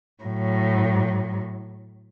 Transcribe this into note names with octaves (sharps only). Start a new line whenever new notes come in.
A2 F#3